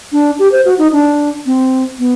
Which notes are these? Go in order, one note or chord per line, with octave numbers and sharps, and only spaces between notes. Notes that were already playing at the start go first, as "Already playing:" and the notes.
D4
G4
C5
F#4
D#4
D4
C4
B3